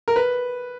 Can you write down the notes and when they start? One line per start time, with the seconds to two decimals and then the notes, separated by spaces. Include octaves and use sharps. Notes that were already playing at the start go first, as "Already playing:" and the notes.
0.08 A#4
0.16 B4